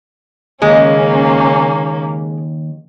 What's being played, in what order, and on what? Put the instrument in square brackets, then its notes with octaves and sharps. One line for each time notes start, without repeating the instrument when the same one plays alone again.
[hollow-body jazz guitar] D#2 [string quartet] C#3 A#3 C#4 [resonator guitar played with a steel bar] G#3